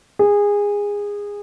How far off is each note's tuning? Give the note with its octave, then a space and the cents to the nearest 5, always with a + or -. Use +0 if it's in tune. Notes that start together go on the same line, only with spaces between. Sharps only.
G#4 -20